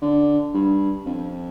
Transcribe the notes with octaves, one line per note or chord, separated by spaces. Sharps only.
D3
G2
F2